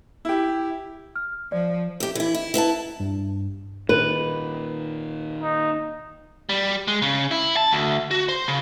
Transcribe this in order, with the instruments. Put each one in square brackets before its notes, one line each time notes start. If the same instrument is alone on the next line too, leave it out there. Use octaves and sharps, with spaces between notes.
[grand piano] E4 G4
[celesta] F6
[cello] F3 [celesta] D5
[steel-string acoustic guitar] E2 G4
E3 E4
E4
E4 B4 F5 A5
[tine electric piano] G2
[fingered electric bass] A#2 D#3 [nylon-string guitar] B4
[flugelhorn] D#4
[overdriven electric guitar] G3
G#3
C#3
E4
A5
D2
F#4
C5
C#3